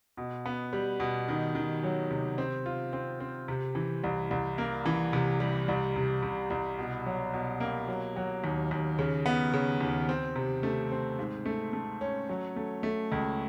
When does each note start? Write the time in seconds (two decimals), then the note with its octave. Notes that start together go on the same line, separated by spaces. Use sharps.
0.17 B2
0.46 B3
0.73 G3
1.00 B2
1.28 D#3
1.55 D#3
1.84 F#3
2.11 C3
2.38 C4
2.66 F4
2.93 C4
3.20 C4
3.48 C3
3.75 E3
4.03 C2
4.31 C2
4.58 A#3
4.86 E3
5.13 C3
5.40 G3
5.68 C2
5.96 C3
6.23 C3
6.50 C2
6.78 B2
7.06 F#3
7.33 B2
7.60 A#3
7.88 F#3
8.16 F#3
8.44 D#2
8.71 D#2
8.99 C#3
9.26 B3
9.54 C#3
9.80 D#2
10.09 C4
10.36 C3
10.63 A3
10.92 C4
11.19 G#2
11.45 A3
11.73 A3
12.01 C#4
12.29 F#3
12.56 A3
12.83 A3
13.12 C#2